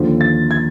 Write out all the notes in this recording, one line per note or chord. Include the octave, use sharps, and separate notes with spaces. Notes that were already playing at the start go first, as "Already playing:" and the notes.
Already playing: D#2 D3 F3
A6
G#6